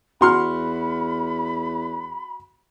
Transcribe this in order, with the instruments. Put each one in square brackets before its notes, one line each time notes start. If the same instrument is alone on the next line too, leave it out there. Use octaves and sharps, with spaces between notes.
[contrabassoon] E2 [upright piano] F#4 C6 F6 [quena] B5